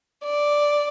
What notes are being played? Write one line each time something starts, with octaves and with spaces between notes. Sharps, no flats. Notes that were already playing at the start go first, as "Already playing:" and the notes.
D5